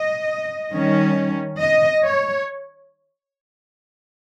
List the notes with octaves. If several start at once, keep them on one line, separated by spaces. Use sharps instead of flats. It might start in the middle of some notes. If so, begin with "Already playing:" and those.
Already playing: D#5
D#3 G3 C#4
D#5
C#5